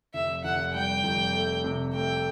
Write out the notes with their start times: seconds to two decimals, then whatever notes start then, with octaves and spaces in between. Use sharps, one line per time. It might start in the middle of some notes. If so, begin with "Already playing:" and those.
0.14 F1 E5
0.44 F1 F#5
0.74 G3 G5
1.04 F1
1.34 A3
1.64 C3
1.94 A3 G5